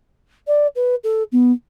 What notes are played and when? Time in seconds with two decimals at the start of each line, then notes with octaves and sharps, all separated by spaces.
0.47 D5
0.75 B4
1.03 A4
1.32 B3